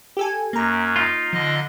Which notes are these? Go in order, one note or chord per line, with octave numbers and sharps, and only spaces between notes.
G4 A4 G#5
F#2 A#3 A#5
D#4 F4
D3 F3 D#5